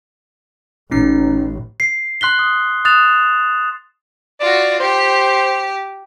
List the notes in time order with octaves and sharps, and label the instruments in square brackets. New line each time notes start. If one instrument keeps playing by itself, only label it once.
[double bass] A1 [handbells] C#4 D#4 C7
[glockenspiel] C7
C6 F#6 B6 G7
D#6
D#6 F#6 A6 E7 F7
[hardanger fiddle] F4 F#4 [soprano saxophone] D5
[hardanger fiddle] G4 [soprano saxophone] C5